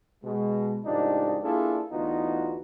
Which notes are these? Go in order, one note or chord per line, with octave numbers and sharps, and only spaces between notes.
B2 G#3
C#2 A2 F3 D4 D#4 G4
A#3 D4 E4 F4 G#4 A4
D2 E3 B3 D#4 F4 F#4